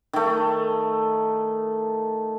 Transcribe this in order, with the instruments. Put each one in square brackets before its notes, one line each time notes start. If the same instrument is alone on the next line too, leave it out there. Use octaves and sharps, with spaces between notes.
[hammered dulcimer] D#3 A3